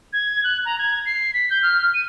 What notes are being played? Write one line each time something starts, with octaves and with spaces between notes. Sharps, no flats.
G#6
F#6
A#5
G#6
C7
B6
G6
F6
D#7